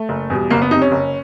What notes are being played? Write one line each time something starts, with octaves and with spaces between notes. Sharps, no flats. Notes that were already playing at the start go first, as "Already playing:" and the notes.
Already playing: A3
F#1
E2 B2 G3
F#1 A#3
B3
F2 C3 D#4
C#4
F#1